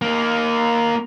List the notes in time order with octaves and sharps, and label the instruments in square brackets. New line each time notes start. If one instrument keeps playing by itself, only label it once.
[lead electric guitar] A#3 D#4